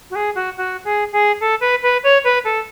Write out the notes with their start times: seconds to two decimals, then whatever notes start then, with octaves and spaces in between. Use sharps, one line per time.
0.10 F#4
0.15 G#4
0.35 F#4
0.57 F#4
0.85 G#4
1.12 G#4
1.40 A4
1.61 B4
1.83 B4
2.04 C#5
2.24 B4
2.44 A4